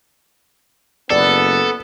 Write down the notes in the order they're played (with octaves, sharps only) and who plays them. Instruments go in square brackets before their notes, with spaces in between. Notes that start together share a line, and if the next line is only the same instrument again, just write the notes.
[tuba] F#1 [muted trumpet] B3 [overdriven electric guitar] A4 [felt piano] D5